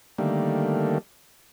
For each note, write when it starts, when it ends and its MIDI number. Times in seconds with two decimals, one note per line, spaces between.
0.18 0.98 50
0.18 0.98 51
0.18 0.98 55
0.18 0.98 57
0.18 0.98 58